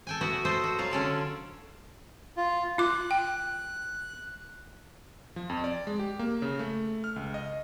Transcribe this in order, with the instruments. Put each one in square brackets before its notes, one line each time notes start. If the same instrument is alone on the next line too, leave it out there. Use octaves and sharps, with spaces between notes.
[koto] A4 G5 G#5
B3 E4 F#4
A4 C5 D#5 E5
F#4
F#3 F4
D3 C#4 A4 D5
[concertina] F4
[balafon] F4 D6 [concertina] F#6
[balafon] G5
[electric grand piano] F3
F2
D5
G#3
G4
A#3
C#3
A3
F6
C#2
D#5